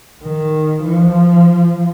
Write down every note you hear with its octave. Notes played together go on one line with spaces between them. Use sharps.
D#3
F3